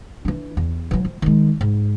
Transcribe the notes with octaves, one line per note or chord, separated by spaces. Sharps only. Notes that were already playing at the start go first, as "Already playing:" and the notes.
E3 D4
E2
E3 F#3
F3
D#3 G#3
G#2